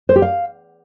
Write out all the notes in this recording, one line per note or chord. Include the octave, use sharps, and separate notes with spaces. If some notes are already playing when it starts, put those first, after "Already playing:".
C5
G4
F5